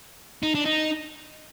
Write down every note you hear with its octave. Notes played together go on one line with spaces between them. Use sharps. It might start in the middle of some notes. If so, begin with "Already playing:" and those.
D#4
D4
D#4